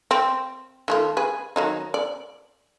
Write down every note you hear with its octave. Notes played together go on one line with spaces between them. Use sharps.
C4
D#3 A3 F4
G#4 B4
D#3 F#3 D#4
D5